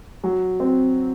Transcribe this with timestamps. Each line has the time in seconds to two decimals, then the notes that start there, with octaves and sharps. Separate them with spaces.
0.24 F#3
0.60 C4